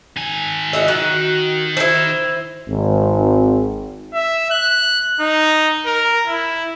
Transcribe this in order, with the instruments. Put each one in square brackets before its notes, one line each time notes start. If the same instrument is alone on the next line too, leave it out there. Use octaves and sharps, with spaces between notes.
[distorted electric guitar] D#3 G#5
[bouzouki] F#4 D#5 E5
[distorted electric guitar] D#3 [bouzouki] F#4
[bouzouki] E4 C5
[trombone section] G#1
[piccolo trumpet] E5
F#6
D#4
A#4
E4